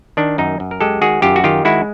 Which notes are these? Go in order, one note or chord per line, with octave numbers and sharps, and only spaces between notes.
D#3 D4
F#2 D#4
F#2
A#4
G#3 G4 A4
D#3 F#4 G#4
F#2 F4 G4
F#4
D#3 F4 G4
G#3 E4 F#4